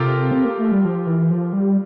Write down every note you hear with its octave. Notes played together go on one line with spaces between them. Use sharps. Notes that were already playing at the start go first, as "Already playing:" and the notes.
Already playing: C3 F4 G4 A4 A#4
C4
A#3
A3
G3
F3
E3
F3
G3